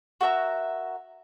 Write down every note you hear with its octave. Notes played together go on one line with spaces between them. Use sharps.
F#4 A#4 E5 A#5